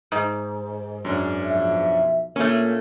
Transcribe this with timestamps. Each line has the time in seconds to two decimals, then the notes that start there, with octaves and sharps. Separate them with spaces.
0.12 G#2
1.05 F#2 C#4 D4
1.46 B1 F3 E5
2.36 A#2 A3 A#3 C#4